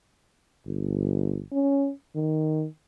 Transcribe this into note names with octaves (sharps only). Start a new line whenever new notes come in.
G1
C#4
D#3